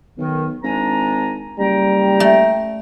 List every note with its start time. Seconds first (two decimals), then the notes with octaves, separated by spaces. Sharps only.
0.18 B1 D#3
0.63 G#1 D4 G#5 A#5
1.59 F#1 G3 G5 A#5
2.20 A3